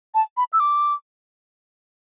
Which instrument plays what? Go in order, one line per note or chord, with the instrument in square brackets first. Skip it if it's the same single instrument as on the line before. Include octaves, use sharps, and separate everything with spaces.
[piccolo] A5
B5
E6
D6